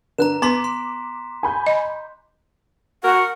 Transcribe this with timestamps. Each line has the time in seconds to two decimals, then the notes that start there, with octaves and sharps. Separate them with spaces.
0.18 D3 D4 B4 A#5 F#6 E7
0.42 B3 B4 A#5 C6 D6 B6
0.64 C6
1.43 G#5 B5 G6
1.66 D#5
3.04 F#4 A#4 F#5